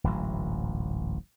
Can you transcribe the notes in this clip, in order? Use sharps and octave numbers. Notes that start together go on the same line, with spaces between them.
D1 A1 G#2 F#3